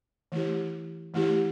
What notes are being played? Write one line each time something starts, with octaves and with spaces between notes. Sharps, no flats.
E3 A3 E4 G4
E3 A3 E4 G4